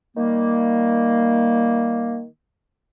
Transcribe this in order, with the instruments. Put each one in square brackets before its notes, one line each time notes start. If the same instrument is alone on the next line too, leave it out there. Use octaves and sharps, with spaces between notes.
[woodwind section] D#3 G3 A#3